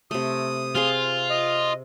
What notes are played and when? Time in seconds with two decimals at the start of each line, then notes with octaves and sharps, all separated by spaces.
0.11 C3 A3 D#6
0.75 C4 F4 G#4 F5
1.30 D#5